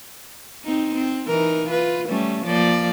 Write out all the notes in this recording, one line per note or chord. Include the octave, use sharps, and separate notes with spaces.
C4 D#4
C4
E3 D#4 A#4
F4 B4
G3 A3 C#4
F3 A#3 D5